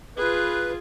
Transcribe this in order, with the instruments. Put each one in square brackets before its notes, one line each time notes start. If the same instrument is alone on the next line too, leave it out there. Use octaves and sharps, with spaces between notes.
[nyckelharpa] F4 G#4 [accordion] B4